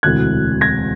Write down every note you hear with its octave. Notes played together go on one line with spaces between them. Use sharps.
E1 D2 C3 E3 F#6 G#6
G#6 A#6